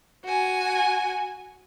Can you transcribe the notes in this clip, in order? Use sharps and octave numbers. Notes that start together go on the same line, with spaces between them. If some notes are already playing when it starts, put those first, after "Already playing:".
F#4 G#5